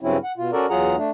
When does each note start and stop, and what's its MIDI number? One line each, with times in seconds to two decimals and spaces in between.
0.01 0.17 43
0.01 0.17 49
0.01 0.17 54
0.01 0.17 60
0.01 0.17 61
0.01 0.17 64
0.24 0.32 78
0.38 0.51 47
0.38 0.51 65
0.53 0.66 61
0.53 0.66 66
0.53 0.66 69
0.53 0.66 70
0.53 0.66 74
0.70 0.96 40
0.70 0.96 54
0.70 0.96 65
0.70 0.96 68
0.70 0.96 78
0.70 0.96 82
0.96 1.11 57
0.96 1.11 62